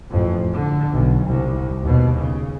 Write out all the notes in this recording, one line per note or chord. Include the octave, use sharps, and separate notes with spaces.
A1 F2
D3
B1
C2
D#2 B2
C#3